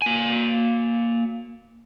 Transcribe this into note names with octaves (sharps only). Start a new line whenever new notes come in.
A#3 G#5